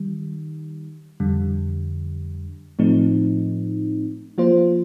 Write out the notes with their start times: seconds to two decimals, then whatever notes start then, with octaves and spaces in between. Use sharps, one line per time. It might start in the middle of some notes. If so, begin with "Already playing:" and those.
Already playing: D#3 G3
1.20 F2 D3 G3
2.79 A2 F3 A3 C4 D#4
4.38 F3 A#3 F4 C5